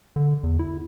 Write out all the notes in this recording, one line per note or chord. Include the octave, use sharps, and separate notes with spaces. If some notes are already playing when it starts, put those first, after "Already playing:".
D3
E2
E4